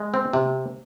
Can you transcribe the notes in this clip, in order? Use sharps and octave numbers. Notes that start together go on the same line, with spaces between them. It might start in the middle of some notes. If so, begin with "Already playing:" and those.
Already playing: G#3
C4
C3